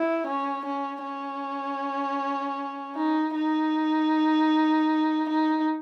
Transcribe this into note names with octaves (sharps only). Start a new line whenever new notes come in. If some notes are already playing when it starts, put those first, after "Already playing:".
Already playing: E4
C#4
C#4
C#4
D#4
D#4
D#4